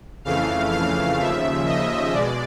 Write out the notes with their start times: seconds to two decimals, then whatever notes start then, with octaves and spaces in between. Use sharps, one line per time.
0.25 F2 C#3 E3 A3 F5
0.72 F5
1.19 D#2 C#3 F3 E5
1.66 D#5
2.13 B2 G#3 D5